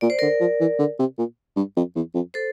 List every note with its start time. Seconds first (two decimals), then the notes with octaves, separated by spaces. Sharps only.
0.01 A#2 D5
0.10 C5
0.19 D3 A#4 D5
0.40 F3
0.60 E3
0.79 D3
0.99 C3
1.18 A#2
1.56 G2
1.76 F2
1.96 E2
2.15 F2
2.34 A4 C5